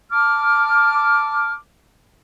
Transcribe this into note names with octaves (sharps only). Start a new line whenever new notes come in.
A5 D6 F6